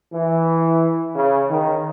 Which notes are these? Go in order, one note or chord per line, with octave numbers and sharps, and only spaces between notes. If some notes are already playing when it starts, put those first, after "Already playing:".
E3
C#3
D#3